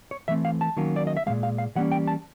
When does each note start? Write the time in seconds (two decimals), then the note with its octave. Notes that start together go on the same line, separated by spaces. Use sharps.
0.11 C#5
0.28 E3 A3 C4 E5
0.45 F5
0.61 A5
0.77 D#3 F#3 A#3 C#4
0.96 D5
1.07 D#5
1.17 E5
1.26 A#2 F3 G#3 F5
1.43 F5
1.58 F5
1.76 E3 G3 A#3 C#4 F#5
1.92 G5
2.08 A5